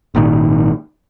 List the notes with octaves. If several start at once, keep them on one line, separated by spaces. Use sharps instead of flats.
G#1 A#2 D#3